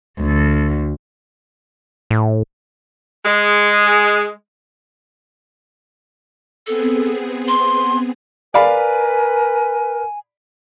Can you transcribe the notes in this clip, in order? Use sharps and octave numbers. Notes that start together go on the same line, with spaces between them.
D2
A2
G#3
B3 C4 G#4 A4
C6
A#4 B4 D5 F5 G#5 B5